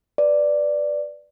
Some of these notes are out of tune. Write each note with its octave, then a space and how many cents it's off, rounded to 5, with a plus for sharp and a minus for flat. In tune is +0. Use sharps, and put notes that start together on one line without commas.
B4 +0 D5 +0